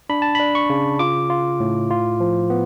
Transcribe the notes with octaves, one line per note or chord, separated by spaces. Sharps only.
D4 B5
A5
D4 B5
C#6
C#3
F4 D6
F4
A2
F4
F3
B3